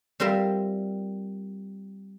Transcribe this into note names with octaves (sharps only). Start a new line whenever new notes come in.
G3 C4 F4 A#4 C5 E5